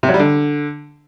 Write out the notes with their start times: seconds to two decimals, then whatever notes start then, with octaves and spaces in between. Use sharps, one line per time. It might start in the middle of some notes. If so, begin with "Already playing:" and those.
0.03 C3
0.09 F#3
0.14 G3
0.19 D3